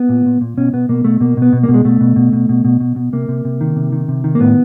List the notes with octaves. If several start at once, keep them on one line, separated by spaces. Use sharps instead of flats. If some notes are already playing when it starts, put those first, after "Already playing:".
Already playing: B3
A#2
A#2
A#2
B2 C#4
B2 B3
B2 A#3
B2 A3
B2 A#3
B2 B3
B2
A#3
B2
G#3
B2 A3
B2
B2
B2
B2
B2
B2
B2
C3 A#3
C3
C3
D#3
C3
D#3
C3
D#3
A#3
A2 B3